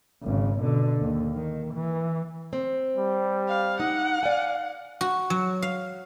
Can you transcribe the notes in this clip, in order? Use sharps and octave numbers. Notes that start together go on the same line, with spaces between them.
G#1 C#3
B2 D3
D#2
D#3
E3
C4
G3
F5
D#4 F#5
D5 F5 G#5
F#4
F#3
F5